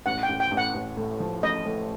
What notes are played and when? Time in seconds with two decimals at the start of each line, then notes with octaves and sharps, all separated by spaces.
0.06 A1 F#5
0.23 G5
0.29 A1
0.40 G5
0.51 A1
0.57 F#5
0.74 A1
0.97 A2
1.20 F3
1.43 A1 D#5
1.66 A2